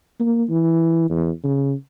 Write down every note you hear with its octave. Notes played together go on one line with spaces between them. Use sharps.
A#3
E3
E2
C#3